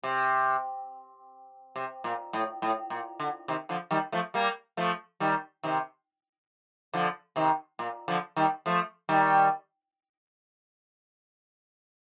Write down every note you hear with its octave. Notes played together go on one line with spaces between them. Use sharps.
C3
C3
A#2
A2
A2
A#2
D3
C3 D#3
D3 F3
D#3 G3
F3 A3
G3 A#3
F3 A3
D#3 G3
C3 D#3
D3 F3
C3 D#3
A#2
D3 F3
D#3 G3
F3 A3
D#3 G3